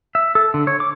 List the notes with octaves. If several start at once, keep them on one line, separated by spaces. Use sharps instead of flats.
E5
A4
D3
C#5
D6